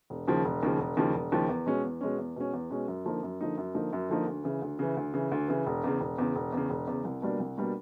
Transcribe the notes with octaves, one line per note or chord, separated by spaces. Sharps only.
E1
D#2 C#3 F3
E1
D#2 C#3 F3
E1
D#2 C#3 F3
E1
D#2 C#3 F3
E2
B2 G#3 C#4
E2
B2 G#3 C#4
E2
B2 G#3 C#4
E2
B2 G#3 C#4
F#2
D3 F3 A#3 D#4
F#2
D3 F3 A#3 D#4
F#2
D3 F3 A#3 D#4
F#2
D3 F3 A#3 D#4
D2
C#3 E3
D2
C#3 E3
D2
C#3 E3
D2
C#3 E3
E1
E2 C#3
E1
E2 C#3
E1
E2 C#3
E1
E2 C#3
C2
B2 G3 A#3 D4
C2
B2 G3 A#3 D4